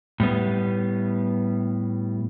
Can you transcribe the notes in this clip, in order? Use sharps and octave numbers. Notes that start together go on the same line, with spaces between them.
A2 G3 B3